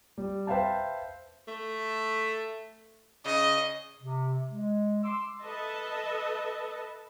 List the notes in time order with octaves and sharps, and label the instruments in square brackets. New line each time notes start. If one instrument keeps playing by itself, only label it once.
[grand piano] G3
B4 C5 E5 F5 G5 A5
[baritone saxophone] A3
[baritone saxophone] C#3 [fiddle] D#5
[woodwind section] C3
G#3
C6 D6 E6
[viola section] A4 B4 D#5 E5 A5